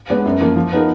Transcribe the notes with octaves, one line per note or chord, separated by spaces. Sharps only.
G#3 B3 D4
F#2
F3 A#3
F3
B3 D#4 A#4